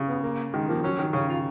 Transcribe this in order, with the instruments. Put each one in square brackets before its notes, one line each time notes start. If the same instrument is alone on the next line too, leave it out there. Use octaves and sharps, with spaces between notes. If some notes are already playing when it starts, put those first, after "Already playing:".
Already playing: [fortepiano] C#3
[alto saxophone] B3
A#3
[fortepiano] D#3 [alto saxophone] G#3
[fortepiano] F3 [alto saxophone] A#3
[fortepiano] F#3 [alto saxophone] C#4
[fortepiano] D#3
[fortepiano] C#3 [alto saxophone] C#4
[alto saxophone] F4